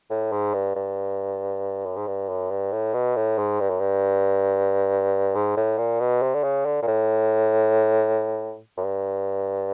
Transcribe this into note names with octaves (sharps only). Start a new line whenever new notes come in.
A2
G#2
G2
G2
F#2
G#2
G2
F#2
G2
A2
B2
A2
G#2
G2
F#2
G2
G#2
A2
A#2
B2
C3
D3
C#3
D3
A#2
A2
F#2
G2